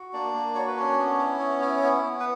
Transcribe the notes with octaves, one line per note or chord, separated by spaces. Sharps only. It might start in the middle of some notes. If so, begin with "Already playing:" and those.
Already playing: F#4
A#3 D4 D5
A#3
F#4 C#5
B4
C#4 D4 C#5
B3
E4
B3
E4
B3
B3
B4